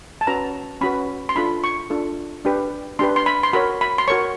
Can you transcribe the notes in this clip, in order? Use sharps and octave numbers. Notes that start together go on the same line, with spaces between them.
A5
C#4 F#4 B4 A#5
C#4 F#4 B4 B5
C6
D4 F4 A4 B5
C#6
D4 F4 A4
D4 G4 B4
D4 G4 B4 C6
C6
B5
C6
F#4 A#4 C#5 B5
B5
C6
F#4 A#4 C#5 C#6